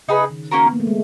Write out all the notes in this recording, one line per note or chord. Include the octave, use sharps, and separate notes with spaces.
C#3 D#4 G#4 B4
D#3
A#3 C#4 F#4 A#4
B3
A#3
A3
G#3